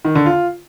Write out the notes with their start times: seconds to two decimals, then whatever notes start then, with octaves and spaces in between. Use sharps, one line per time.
0.05 D#3
0.15 D3
0.26 F4